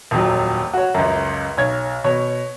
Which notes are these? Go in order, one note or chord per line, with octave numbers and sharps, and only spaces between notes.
D#1 F2 F#3
F#4 C#5
C#2 F#2
B1 C#5 G#6
B2 C#5